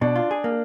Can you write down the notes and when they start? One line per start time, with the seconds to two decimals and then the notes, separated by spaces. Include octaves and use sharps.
0.01 B2 D4 D5
0.16 F4
0.31 G#4
0.44 A#3